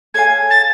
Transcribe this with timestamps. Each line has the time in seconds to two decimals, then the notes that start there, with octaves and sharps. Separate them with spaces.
0.14 A4 C#5 F5 G#5 G#6
0.50 A6